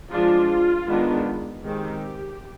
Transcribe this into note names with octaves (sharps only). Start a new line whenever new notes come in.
F3 G#3 D4 F4
D#3 G#3 B3 D4
D#3 G#3 C4 G4